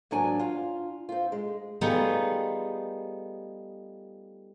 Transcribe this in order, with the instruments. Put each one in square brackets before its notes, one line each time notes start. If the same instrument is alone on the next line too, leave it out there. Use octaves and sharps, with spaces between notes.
[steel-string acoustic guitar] D#2 G#2 F#3 D4 G#5
F4
C4 F4
G#3
[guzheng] G3 A3 B3 D#4 F4 G#4